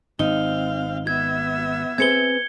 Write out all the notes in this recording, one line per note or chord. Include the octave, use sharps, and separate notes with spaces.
G#1 C4 D#4 F5 G7
B3 E5 G#6
C4 G#4 B4 G#6 C#7 G7